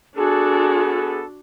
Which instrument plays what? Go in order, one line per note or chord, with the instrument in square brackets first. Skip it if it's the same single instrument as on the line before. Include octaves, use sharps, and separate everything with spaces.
[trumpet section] B3 A4 [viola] D4 F#4 [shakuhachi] G#4